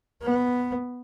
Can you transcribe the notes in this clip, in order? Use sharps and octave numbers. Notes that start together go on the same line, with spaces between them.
B3